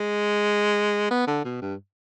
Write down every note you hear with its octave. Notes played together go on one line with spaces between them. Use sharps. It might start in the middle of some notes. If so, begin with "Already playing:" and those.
Already playing: G#3
B3
D3
B2
G2